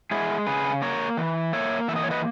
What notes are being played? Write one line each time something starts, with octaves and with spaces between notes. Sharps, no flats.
G#3 E4 G#4
C#3 G#4 B4
A#3 A#4 C#5
E3
A#3 C#5 E5
E3 E5
D#5
C#5
B4 D#5